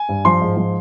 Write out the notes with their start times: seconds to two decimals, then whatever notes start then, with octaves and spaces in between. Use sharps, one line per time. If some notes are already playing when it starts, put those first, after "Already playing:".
Already playing: G#5
0.09 G2
0.25 F3 C6
0.41 G#2
0.57 F3